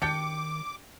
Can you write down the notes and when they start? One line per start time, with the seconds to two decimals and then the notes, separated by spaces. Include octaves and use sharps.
0.02 D#3 D4 G4 G5 D6 C#7